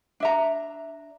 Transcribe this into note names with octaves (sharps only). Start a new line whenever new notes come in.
D4 E5 A#5